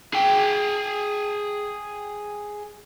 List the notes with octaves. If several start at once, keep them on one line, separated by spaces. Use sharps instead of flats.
G#4 G5